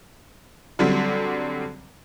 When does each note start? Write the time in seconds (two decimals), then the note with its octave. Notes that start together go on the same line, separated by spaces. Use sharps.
0.79 D3 F#3 G3 C4